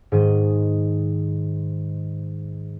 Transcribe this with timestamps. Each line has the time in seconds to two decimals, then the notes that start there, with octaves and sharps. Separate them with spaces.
0.12 G#2 D#3 D#5